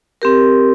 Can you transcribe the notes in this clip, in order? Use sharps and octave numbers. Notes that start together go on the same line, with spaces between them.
C4 G4 A#4